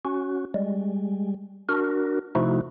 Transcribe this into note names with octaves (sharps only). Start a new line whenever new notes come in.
C#4 F#4
G3 G#3
D4 F#4 A#4
C3 F3 A3 D#4 E4 F#4